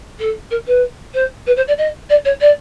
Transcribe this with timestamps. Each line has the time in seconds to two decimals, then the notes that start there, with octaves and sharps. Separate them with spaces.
0.19 A4
0.50 A#4
0.66 B4
1.14 C5
1.46 B4
1.56 C5
1.67 D5
1.77 D#5
2.09 D5
2.24 C#5
2.40 D5